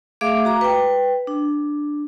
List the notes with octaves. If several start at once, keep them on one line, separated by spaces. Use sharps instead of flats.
A3 G#4 E5 F5 D6
F#4 A#5 D6
B4 G5
D4